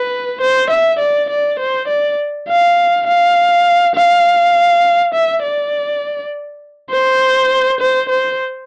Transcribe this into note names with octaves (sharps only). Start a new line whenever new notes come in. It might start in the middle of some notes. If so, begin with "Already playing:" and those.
Already playing: B4
C5
E5
D5
D5
C5
D5
F5
F5
F5
E5
D5
C5
C5
C5